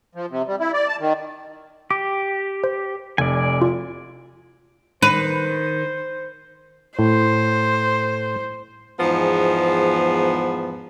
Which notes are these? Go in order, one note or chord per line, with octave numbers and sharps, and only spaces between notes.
F3
C3
G3
E4
D5
A5
D#3
G4 D6
C5
F1 D5 G#5
F4
D#3 B4 C5
A2 C5
E2 G#2 F3 B3